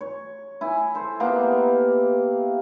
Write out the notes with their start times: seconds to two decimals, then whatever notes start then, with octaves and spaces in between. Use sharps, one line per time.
0.01 C#5
0.61 E4 G#5
0.95 A4 C5
1.20 A#3 B3 G4